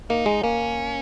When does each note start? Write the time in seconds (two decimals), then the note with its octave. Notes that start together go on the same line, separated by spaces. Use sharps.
0.10 A#3 D#4
0.26 G#3
0.43 A#3 C#4